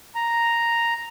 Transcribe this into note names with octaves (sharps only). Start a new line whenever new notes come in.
A#5